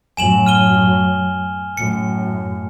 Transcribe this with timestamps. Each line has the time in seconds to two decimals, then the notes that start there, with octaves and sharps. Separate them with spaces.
0.17 F#2 A2 F#3 G#5 E7 F#7
0.46 F6 D#7 G7
1.77 F#2 A2 C#7